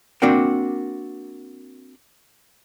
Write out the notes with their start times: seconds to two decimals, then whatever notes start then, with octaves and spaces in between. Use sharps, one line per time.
0.22 A#3 C4 D4 F#4 A#4 G5